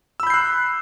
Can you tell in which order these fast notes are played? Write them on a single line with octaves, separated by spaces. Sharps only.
E6 B5 G6 C7 F#6